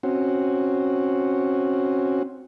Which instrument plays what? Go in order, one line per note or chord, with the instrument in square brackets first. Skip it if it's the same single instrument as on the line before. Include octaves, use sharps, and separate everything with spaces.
[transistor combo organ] C4 C#4 F#4